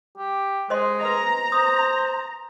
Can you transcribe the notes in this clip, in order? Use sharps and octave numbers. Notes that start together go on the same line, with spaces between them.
G4
G#3 C5 D#5 C6
B4 D#5 A#5
C5 D#6